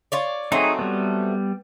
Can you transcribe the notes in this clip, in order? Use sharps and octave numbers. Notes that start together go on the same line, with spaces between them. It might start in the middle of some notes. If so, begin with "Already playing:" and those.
F4 C#5 D5
F#3 A3 C4 D#4 G#4
G3 B3